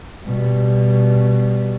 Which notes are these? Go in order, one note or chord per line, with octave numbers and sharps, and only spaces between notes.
B2 G3